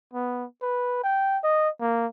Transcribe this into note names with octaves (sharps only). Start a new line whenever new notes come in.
B3
B4
G5
D#5
A#3